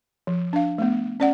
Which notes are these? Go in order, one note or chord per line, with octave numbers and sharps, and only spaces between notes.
F3
D4 F5
A3 B3
C#4 D5 F#5